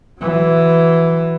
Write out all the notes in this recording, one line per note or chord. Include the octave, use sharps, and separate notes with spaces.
E3 F#3